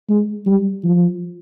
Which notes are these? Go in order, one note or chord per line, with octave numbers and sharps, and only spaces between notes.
G#3
G3
F3